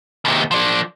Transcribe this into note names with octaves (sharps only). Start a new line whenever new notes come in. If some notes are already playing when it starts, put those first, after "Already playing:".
D#2 C3
F3 D5